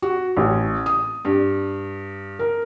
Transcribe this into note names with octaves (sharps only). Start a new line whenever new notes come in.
F#4
A1
D#6
G2
A#4